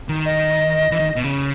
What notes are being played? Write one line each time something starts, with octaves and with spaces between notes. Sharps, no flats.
D#3
D#5
E3
D#3
B2
C#3